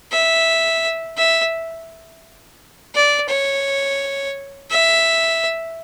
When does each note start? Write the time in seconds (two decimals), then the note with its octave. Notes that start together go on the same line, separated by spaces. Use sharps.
0.12 E5
1.18 E5
2.95 D5
3.29 C#5
4.71 E5